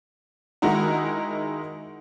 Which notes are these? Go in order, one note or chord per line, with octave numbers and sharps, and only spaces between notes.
D#3 G#3 D#4 E4 F#4